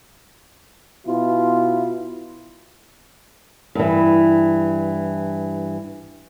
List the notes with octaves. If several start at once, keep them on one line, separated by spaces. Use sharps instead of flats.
B2 E4 F4
G2 E3